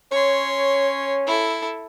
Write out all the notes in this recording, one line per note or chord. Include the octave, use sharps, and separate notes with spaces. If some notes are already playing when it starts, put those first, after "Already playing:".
C#4 C#5 C6
E4 A4